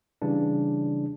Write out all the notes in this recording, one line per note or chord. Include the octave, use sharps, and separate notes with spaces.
C#3 E3 G3 D4